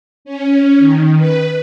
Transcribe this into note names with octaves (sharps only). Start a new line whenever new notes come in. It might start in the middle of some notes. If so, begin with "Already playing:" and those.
C#4
D#3
B4